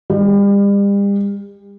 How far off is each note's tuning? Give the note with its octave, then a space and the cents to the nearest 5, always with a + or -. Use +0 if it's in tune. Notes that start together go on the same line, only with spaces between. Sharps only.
G3 +40